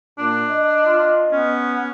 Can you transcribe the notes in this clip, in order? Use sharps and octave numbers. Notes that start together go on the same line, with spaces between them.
A#2 D4
D#5
F4
B3 C#4